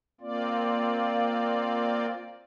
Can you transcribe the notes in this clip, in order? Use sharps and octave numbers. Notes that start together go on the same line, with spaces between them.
A#3 C4 F4 D5